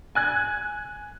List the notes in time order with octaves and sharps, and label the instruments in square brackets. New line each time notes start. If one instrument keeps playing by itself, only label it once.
[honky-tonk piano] G#5 F#6 G#6